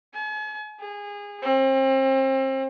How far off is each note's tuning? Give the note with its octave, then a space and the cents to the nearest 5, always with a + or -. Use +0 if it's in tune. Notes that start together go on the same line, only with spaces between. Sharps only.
G#5 +45
G#4 -25
C4 +35